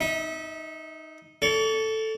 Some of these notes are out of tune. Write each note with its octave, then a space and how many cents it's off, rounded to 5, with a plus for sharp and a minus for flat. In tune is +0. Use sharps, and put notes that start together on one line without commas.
D#4 +0 E5 -30
A4 +0 C#5 +40